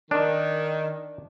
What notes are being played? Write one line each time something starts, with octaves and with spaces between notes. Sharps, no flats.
D#3 D4